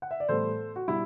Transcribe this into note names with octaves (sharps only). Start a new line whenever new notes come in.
F#5
E5
D5
A2 E3 G3 B3 A4 C5
F#4
B2 G3 E4